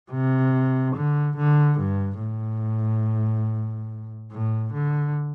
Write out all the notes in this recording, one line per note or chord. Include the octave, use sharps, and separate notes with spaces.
C3
D3
D3
G2
A2
A2
D3